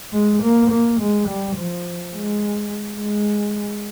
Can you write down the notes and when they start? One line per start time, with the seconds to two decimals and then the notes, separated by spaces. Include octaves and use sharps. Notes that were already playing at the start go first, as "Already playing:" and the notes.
0.13 G#3
0.42 A#3
0.70 A#3
1.00 G#3
1.28 G3
1.56 F3
2.14 G#3
3.00 G#3